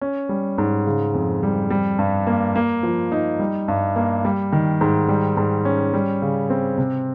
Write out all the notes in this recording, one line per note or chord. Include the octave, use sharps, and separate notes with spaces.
C#4
G3
G#2
C#3
F2
G3
G3
G2
A#3
A#3
F3
D#4
G3
G2
A#3
G3
D#3
G#2
G3
G#2
C#4
G3
C#3
C4
C3